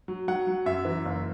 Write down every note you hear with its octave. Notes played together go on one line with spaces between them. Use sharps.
F#3
F#3 F#5
F#3
F#2 E5
E3
F#1